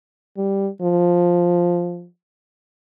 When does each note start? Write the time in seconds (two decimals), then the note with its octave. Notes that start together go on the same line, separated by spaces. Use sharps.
0.37 G3
0.82 F3